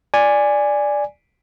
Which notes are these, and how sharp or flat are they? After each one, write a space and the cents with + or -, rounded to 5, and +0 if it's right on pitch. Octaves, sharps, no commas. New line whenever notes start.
D5 +0 G#5 -5